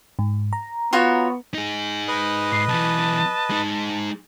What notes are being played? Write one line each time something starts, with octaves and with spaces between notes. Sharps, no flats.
G#2
A#5
B3 F4 F#4 C#5
D#4 G#4
B4 D#5
G#2 C7
B1 E3 A5
G#3 D#4